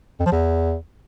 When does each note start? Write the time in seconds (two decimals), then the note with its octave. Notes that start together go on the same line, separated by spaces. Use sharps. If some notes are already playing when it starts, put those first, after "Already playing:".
0.20 F2
0.26 F3
0.32 E2